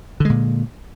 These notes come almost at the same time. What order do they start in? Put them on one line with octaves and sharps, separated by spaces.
D3 G#3 A#2